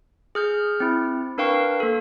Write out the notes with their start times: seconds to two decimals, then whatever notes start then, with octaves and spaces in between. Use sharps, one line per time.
0.35 G#4 F6 G6
0.80 C4 E4
1.38 D4 A#4 B4 F5 G5 C#6
1.80 A#3 A4